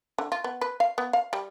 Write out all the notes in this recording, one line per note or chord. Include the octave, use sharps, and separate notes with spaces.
D3
F4
B3
B4
F5
B3
F5
G3